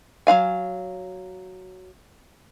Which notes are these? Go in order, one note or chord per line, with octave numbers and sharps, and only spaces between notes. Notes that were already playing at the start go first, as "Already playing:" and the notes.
F#3 F4 F5 G#5